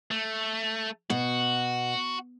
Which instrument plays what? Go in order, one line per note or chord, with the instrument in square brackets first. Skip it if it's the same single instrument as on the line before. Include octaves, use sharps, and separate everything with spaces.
[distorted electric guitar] A3
[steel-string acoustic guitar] B2 [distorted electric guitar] F#4